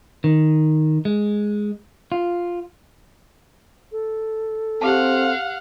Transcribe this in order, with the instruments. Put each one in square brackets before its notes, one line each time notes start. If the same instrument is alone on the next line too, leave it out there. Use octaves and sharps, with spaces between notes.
[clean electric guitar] D#3
G#3
F4
[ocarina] A4
[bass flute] C4 [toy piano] G4 G#4 A5 [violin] F5 F#5